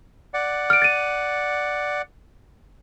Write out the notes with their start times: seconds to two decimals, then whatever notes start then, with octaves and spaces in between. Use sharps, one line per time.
0.34 D5 F#5
0.70 F6 D7
0.82 A6 D#7